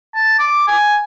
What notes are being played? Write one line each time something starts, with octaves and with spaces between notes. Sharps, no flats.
A5
D6
G#5